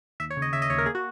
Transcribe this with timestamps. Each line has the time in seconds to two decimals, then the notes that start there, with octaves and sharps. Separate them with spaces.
0.20 D#2 E5
0.30 C#5
0.37 C#3
0.42 D#5
0.53 C#3 E5
0.62 D#5
0.70 D#2 C#5
0.78 A#4
0.86 A#3 G#4
0.95 F#4